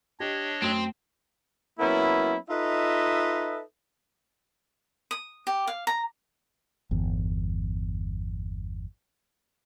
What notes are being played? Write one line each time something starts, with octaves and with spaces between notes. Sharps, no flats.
D4 G4 C#5 D#5
F#2 A3 C4 D#6
F#3 A#3 B3 C#4 E4
D#4 F4 A4 B4 D#5 E5
D#6
G4
F5
A#5
G1 E2